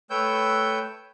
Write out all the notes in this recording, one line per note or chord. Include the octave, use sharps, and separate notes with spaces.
A3 B4 C#5 G5 E6 G6